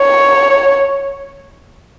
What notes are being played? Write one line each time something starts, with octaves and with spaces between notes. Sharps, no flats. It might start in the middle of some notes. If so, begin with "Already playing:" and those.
Already playing: C#5